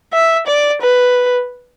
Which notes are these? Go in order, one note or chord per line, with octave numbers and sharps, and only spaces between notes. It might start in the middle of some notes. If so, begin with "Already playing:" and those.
E5
D5
B4